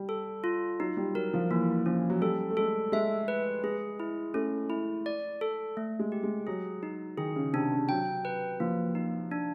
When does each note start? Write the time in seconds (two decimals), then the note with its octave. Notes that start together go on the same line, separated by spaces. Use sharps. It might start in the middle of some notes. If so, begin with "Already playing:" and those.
Already playing: G3
0.09 A4
0.44 F4
0.80 F#3 D#4
0.97 G3
1.15 F#3 A#4
1.34 F3
1.51 E3 A#3
1.86 F3 C#4
2.10 F#3
2.21 G3 A4
2.51 A3
2.57 G#3 A4
2.92 G#3 E5
3.28 B4
3.63 G#3 G#4
4.00 E4
4.34 A3 C#4
4.70 E4
5.06 D5
5.41 A4
5.77 A3
5.99 G#3
6.12 G4
6.23 G#3
6.47 F#3 G#4
6.83 D#4
7.18 D#3 G#4
7.36 C#3
7.53 C3 D4
7.72 C#3
7.89 F#3 G5
8.25 B4
8.60 F3 A#3
8.95 D#4
9.31 D4